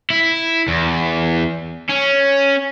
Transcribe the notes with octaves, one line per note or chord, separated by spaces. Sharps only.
E4
E2
C#4